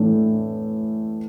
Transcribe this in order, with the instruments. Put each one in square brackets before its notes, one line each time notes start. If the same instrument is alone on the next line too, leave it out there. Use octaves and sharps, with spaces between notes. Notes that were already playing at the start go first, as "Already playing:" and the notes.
Already playing: [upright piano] A2 E3 A3 D4